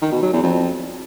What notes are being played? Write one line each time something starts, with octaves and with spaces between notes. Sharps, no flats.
D#3
B2
F#3
E2
F2